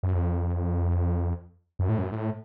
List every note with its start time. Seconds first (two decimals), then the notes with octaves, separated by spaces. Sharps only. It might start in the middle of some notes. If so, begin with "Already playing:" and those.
0.03 F#2
0.14 F2
1.79 F#2
1.89 A2
1.99 F#2
2.12 A2